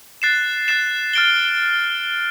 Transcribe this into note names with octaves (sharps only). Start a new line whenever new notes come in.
F#6 A6 C7 E7
F#6 A6 C7 E7
F6 A6 D7 G7